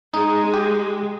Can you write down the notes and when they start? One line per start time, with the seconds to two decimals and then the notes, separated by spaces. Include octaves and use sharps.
0.14 G#3 D#4
0.54 G4